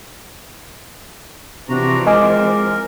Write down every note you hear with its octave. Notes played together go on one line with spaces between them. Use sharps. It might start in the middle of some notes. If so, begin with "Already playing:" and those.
C3 E3 F3 C4 D4 F#4 A#5
G#3 A#4 D#5 G#5 D6